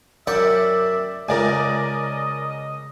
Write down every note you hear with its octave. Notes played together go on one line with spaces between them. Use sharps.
F#2 D5 E5 G5 C#6
C#2 A#4 D5 D#5 G#5